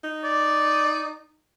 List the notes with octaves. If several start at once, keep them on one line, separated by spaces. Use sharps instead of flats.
D#4
D5